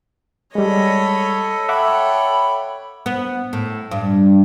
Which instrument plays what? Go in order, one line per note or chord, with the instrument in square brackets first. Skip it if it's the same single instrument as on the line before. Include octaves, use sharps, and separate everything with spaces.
[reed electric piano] G3 G#3 [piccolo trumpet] A4 [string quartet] C#5 D#5 B5
[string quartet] C#5 G5 [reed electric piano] E5 F#5 D6 [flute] B5
[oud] B3
A2
G2